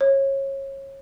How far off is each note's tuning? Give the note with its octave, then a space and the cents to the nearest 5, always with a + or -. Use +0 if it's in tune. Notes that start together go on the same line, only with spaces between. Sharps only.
C#5 -25